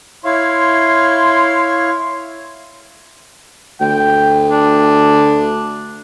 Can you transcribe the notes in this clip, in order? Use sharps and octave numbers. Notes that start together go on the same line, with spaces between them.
E4 C#5 F5 C6
D2 G5
D4